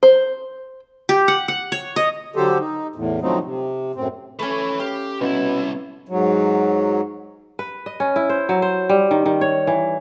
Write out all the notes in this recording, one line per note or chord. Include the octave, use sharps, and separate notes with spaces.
C5
G4
F#5
F#5
C#5
D#5
D3 F#3 G4 A4 C5
D#4
E2 A2
D3 F3 F#3 A3 C4 D#4
C3
F#2 A2 C4
A3 C#4 B4 G#5
G4 F5
C2 B2 C#4 E4
G#2 F#3
B4
D#5
C#4
E4
C5
F#3
C5
G3
D#3
D#3
C#5
E3